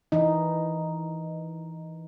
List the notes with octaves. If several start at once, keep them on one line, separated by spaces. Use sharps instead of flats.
E3 D#4